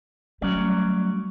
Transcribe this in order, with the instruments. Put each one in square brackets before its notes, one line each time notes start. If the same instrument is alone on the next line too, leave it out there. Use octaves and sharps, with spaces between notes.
[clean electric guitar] F#3 C#4 D5 [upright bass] G3 A3